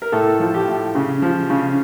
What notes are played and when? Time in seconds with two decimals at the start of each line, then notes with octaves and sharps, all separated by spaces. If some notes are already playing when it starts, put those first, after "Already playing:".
0.02 A#4
0.12 A2 A4
0.40 F3
0.54 G4
0.68 A2
0.95 C#3
1.22 F3
1.50 C#3